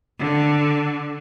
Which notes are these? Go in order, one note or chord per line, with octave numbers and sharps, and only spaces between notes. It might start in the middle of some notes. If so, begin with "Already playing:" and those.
D3